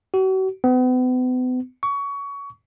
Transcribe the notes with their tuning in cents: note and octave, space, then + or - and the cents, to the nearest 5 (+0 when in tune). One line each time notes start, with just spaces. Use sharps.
F#4 +40
B3 +40
C#6 +25